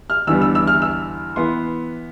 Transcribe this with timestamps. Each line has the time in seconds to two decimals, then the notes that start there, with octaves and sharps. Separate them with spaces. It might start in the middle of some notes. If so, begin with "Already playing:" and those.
0.10 F6
0.27 E2 D3 G3 B3 E6
0.42 E6
0.55 E6
0.67 F6
0.82 E6
1.36 E3 B3 C6